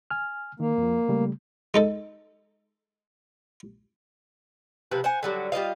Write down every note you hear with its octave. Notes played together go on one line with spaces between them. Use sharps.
G#5 F6
D#3 A#3
F2 F3
C#3 G3 A3
G#3 D#4 A4
C3 F3 B4
C5 F#5 G#5
D3 F#3 G3
G3 F4 D#5 F5